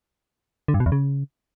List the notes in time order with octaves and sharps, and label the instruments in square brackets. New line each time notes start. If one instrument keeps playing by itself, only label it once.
[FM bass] D3
G2
B2
E2
C#3